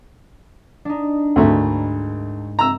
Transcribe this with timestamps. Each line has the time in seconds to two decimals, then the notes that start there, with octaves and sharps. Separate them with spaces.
0.85 D4 D#4
1.36 D2 G#2 A3 A#4 B5
2.59 A#5 E6